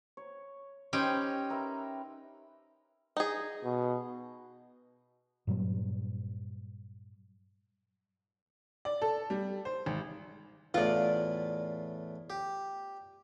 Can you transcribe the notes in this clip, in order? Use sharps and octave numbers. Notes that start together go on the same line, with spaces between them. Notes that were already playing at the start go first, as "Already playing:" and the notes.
C#5
C#4 D#4 G4 B4 C5 G5
A#4 B4 E5
D#4 G#4
B2
G2 A#2 F#3 G3
D5
A4
G3
C5
G#1
E2 A2 F4 D5
G4